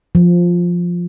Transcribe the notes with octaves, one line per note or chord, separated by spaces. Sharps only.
F3